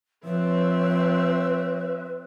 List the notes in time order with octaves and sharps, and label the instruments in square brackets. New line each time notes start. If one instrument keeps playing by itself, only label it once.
[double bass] F3 [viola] C4 E5 [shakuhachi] B4 [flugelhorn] C#5